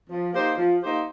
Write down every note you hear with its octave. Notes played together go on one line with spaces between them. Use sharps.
F3
A#3 D#4 G4 C5
F3
A#3 D#4 G4 C5